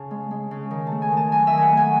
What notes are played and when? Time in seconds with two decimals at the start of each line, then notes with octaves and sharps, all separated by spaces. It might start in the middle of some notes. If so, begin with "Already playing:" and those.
Already playing: C#3 A5
0.11 G#3
0.31 G#3
0.51 C#3
0.71 D#3
0.87 A3 A5
1.02 G#5
1.12 D#3
1.17 A5
1.31 F#3 G#5
1.47 E5
1.52 D#3
1.58 F#5 G#5
1.72 A3
1.77 G#5